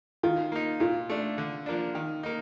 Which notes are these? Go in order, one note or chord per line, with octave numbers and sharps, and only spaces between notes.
D#3 F4
A#3 D#4
A#2 F4
A3 D4
D3
F3 A#3 D4
D#3
A#3 D#4